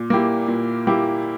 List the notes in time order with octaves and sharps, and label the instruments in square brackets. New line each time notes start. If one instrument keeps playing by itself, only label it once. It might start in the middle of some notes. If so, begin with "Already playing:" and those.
Already playing: [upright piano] A#2
A#3 E4 G4
A#2
A#3 E4 G4